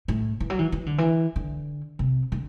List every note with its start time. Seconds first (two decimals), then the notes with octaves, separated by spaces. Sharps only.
0.08 A2
0.40 E3
0.50 F#3
0.59 E3
0.72 E3
0.86 D3
0.98 E3
1.36 D3
1.99 C3
2.32 D3